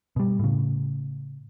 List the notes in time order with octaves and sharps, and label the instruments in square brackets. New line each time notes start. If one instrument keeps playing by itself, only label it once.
[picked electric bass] B2 G3
A2 C#3